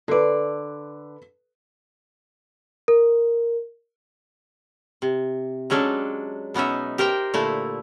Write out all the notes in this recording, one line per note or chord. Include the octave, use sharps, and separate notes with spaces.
D3 A4 B4 D5
A#4
C3
F#3 G#3 C#4 D4 A4
B2 B3 C#4 D#4 E5
G4 A#4 C5 G5
A#2 D3 A3 E4